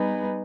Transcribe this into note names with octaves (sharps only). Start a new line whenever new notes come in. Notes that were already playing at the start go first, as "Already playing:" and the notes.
Already playing: G3 B3 D#4 G#4 B4